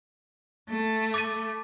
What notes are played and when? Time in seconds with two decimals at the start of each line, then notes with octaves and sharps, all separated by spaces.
0.68 A3
1.14 D6 A6 D#7